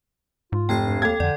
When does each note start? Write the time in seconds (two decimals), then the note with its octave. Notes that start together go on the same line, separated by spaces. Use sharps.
0.52 G#2 F4
0.69 F1 G5 G#6 C7
0.85 G2
1.02 D#2 A4 G5 G#6
1.20 F2 D3 D5